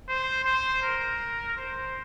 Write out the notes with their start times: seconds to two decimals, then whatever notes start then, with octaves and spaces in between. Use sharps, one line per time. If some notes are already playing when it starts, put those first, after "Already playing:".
0.08 C5
0.44 C5
0.82 A#4
1.57 C5